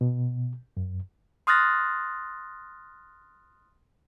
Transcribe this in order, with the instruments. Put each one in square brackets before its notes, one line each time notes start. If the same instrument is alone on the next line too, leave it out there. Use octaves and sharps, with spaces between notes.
[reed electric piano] B2
F#2
[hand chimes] C6 D#6 F6 F#6 A6 A#6